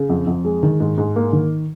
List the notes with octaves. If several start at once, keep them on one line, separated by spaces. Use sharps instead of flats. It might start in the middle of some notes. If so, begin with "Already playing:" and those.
Already playing: C#3
F2
F2
G#3
D#3
G#2
G#2
A#3
D#3